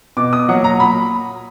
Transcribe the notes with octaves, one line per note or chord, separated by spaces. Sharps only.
B2 D6
D#6
F#3 A#3 F#5
A#5
A#2 B5